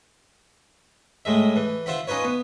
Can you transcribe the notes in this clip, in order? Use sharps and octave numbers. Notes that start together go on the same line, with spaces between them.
A2 G#3 E5
E3
F4 C5 E5 F#5 B5
C#4 D#4 F4 B4 C#5
B3